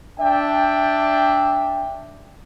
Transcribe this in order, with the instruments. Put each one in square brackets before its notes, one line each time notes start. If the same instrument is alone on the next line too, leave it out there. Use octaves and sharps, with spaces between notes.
[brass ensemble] D4 E5 G5